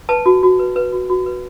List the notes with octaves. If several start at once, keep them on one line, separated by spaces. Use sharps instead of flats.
B4 A5
F#4
F#4
B4
B4
F#4
F#4
B4